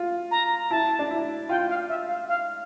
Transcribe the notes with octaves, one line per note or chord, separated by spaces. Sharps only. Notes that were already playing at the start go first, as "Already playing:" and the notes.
Already playing: F4
A#5
E4 A5
D4
E4
F4 G5
F5
E5
F5
F5